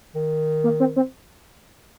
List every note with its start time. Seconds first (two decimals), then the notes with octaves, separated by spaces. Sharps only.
0.15 D#3
0.64 A#3
0.80 C4
0.96 C4